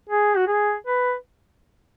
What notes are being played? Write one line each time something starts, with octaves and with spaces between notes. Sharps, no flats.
G#4
F#4
G#4
B4